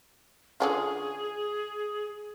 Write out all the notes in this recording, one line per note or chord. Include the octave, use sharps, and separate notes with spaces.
D3 C#4 F4 G#4